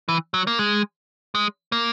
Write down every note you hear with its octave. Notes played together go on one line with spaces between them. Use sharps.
E3
F#3
A#3
G#3
G#3
A#3